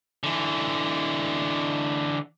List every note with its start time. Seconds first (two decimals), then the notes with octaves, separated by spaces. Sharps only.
0.23 D3 E3